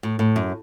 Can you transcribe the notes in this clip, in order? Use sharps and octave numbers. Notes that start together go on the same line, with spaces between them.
A2
A2
F#2